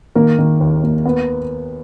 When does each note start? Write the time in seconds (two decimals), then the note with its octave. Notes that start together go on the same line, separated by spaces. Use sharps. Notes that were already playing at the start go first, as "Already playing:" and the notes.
0.15 D#3 A#3 A#4
0.38 D#3
0.61 D#2
0.83 A#3
1.05 B3